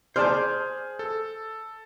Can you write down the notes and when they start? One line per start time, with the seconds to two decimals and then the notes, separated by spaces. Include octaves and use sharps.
0.16 G#4 C5 D5 A5 F6 G6
0.99 A4